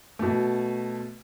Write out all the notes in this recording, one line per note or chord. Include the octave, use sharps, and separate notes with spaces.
B2 A3